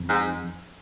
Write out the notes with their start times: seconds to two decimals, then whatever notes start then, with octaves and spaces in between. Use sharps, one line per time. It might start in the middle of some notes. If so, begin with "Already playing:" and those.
Already playing: F2
0.09 G#2